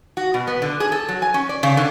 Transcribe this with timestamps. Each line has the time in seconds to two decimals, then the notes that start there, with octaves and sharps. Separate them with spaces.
0.17 F#4
0.34 B2
0.47 B3
0.62 D3
0.80 G#4
0.92 A4
1.08 F#3
1.22 G#5
1.34 C#4
1.49 D5
1.63 C#3
1.77 D3